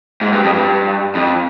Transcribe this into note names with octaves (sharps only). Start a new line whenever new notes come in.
G#2
G2
F2
G2
F2